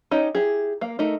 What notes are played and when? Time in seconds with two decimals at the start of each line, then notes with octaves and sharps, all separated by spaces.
0.11 C#4 D#4 G4 D#5 G5
0.35 E4 G4 G#4
0.81 A#3 F5
0.99 A3 D#4 A#4 D#5